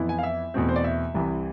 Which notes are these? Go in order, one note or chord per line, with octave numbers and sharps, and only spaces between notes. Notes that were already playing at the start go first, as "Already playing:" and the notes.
Already playing: F2 E3 B3 E4
G#5
F5
E5
E2 B2 A3 C4
C5
D5
E5
C2 C3 E3